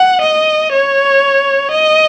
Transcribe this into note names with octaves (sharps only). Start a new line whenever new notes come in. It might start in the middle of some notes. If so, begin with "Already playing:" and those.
Already playing: F#5
D#5
C#5
D#5